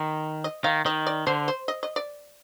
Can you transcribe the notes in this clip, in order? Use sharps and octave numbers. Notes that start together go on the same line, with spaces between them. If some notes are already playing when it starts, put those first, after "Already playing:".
Already playing: D#3
D#5
D#3 F5
D#3 D#5
D5
D3 C5
C5
D#5
D#5
D5